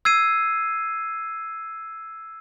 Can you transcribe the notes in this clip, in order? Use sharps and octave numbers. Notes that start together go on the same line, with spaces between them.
E6 G#6 C7 D#7